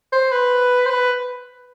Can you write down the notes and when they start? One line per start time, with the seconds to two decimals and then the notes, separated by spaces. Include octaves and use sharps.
0.13 C5
0.32 B4
0.86 C5
0.90 B4